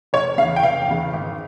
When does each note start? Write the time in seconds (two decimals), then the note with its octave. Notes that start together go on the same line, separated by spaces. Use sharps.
0.13 F1 C#5
0.38 C#3 F5
0.42 E2
0.56 G5
0.63 F1 F5
0.88 E2 C#3
1.13 G#1